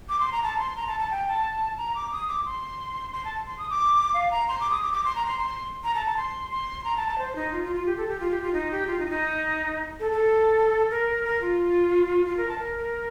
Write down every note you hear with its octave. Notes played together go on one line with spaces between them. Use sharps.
D6
C6
A#5
A5
C6
A#5
A5
A5
G5
A5
A#5
D6
D#6
D6
C6
C6
A5
C6
D#6
D6
F5
A#5
C6
D6
D#6
D6
D6
C6
A#5
C6
C6
A#5
A5
A5
C6
C6
A#5
A5
A5
C5
D#4
F4
F4
F4
G4
A4
G4
F4
G4
F4
D#4
G4
F4
D#4
F4
D#4
A4
A4
A#4
A#4
F4
F4
A#4
A5
A#4
A#4